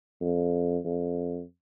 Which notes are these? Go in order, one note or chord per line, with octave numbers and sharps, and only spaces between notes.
F2
F2